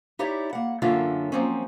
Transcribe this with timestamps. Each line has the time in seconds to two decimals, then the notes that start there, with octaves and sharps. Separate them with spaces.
0.19 D#4 E4 G4 C#5 D5
0.53 A#3 F#5
0.82 F#2 D3 A#3 F4 C#5 E5
1.32 F3 F#3 A#3 C4 C#4